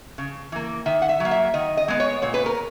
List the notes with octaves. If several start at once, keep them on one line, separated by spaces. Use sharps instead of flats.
C#3
E3 A#3
D#3 E5
F#5
E5
F#3 A#3
E5
D#3 D#5
D#5
G#3 B3
C#5
A#2 C#5
B4
A#4